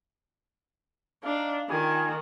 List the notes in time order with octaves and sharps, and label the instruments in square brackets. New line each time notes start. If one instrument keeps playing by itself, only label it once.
[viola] D4 [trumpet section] D#4 F5
[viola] D#3 [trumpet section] F4 G5 G#5